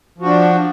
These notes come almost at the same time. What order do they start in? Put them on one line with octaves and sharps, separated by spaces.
F3 F#4 D4